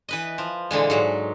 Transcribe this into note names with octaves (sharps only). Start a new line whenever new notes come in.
E3 B4 D#5
F3
A#2 D3 E3 G#3
G#2 F#3